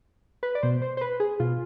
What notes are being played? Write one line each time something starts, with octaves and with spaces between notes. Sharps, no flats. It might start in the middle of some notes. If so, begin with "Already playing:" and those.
B4
D5
B2 C5
C5
C5
B4
G#4
B2 F4